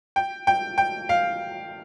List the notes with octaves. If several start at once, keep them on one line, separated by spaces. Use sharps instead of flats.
G5
G5
G5
F5